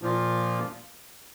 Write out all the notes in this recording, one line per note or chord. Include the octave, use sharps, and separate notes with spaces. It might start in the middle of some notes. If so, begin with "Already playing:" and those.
A#2 F3 A#3 F4